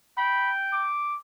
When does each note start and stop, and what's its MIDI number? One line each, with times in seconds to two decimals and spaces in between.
0.18 0.83 79
0.18 0.51 83
0.73 1.17 86